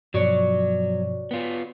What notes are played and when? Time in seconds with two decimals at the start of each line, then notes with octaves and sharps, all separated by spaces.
0.14 G2 B2 F3 F#3 F#4 C#5 D5
1.31 B3 F4